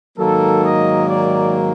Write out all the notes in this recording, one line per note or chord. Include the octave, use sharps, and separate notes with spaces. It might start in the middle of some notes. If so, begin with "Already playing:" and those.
G#2 D#3 F#3 A#3 A4
D#5
D5